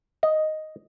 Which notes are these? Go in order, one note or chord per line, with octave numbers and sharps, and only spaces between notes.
D#5